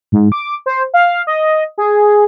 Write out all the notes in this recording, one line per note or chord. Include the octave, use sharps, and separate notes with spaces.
G#2
D6
C5
F5
D#5
G#4